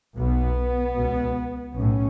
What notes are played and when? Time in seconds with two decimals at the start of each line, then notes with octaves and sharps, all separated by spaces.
0.17 B1 B2 B3
0.95 C#2 B2
1.74 B1 A2 C#4